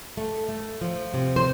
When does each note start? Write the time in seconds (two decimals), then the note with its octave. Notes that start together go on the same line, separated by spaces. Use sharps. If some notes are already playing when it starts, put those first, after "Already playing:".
0.17 A3
0.49 A3
0.81 F3
1.14 C3
1.36 C5